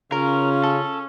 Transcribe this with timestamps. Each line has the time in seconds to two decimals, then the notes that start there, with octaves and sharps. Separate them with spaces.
0.12 C#3 C#4 F4 A#4
0.64 A4